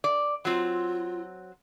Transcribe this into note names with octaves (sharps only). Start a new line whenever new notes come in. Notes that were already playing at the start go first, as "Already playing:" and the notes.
D5
F#3 C4 F4